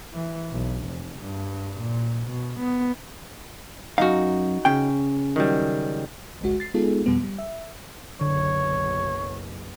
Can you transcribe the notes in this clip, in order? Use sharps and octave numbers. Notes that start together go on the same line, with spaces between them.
E3
B1
F1
G2
A#2
B2
B3
F#2 D#3 D#4 F#4 F5
C#3 G5
D#3 F#3 G3
G#1 C#2 G#3 F#4
A6 C7
G#3 B3 D#4 F4 G#4 A4
F2 B2 G3 B3
G3
E5
F#1 B1 D3 C#5